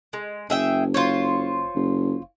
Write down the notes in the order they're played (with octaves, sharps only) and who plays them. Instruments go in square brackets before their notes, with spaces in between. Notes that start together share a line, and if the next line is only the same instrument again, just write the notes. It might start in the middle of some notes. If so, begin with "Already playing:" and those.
[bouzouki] G#3
[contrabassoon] F#1 [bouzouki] G#4 E5 G5
[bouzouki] F4 C5 C#5
[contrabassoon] F#1